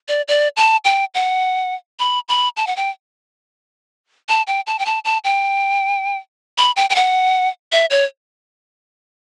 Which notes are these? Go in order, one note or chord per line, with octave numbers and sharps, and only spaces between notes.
D5
D5
A5
G5
F#5
B5
B5
A5
F#5
G5
A5
G5
A5
G5
A5
A5
G5
B5
G5
G5
F#5
E5
C#5